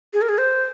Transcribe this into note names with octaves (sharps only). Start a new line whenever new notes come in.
G#4
A#4
G#4
C5